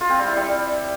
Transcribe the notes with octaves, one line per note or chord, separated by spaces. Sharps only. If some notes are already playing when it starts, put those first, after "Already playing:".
F4
C4
G3
E4
G3